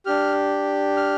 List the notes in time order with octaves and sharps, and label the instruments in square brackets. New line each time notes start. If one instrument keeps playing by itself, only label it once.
[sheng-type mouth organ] D4 G4 F6
F6